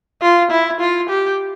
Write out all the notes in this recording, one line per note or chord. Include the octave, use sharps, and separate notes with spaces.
F4
E4
F4
G4